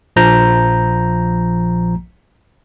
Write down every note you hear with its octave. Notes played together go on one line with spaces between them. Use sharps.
A#1 F3 A#5 G6